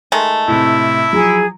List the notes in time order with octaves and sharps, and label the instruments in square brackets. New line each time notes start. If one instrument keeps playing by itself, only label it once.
[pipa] D#3 G#3 A3
[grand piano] A2 C3 [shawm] E4
[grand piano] F3 F#3 [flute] G#4